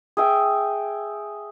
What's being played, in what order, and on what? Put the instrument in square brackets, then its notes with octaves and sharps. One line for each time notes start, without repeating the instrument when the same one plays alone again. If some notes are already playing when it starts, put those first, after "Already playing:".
[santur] G#4 E5 G5